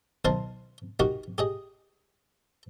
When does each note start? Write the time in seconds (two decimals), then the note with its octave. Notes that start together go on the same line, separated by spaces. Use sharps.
0.25 B1 D#3 A#4 C5 A5 C6
1.00 D#4 F#4 G4 A#4
1.38 G4 G#4 D#5